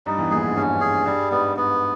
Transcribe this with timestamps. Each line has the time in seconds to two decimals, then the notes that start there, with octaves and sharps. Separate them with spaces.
0.06 G2 G3 D#4
0.18 E2 E3
0.31 A#1 A#2 G#4
0.43 G#2
0.56 G2 C#4
0.81 G#4
1.06 G2 G3
1.31 G#2 B3
1.55 G2 B3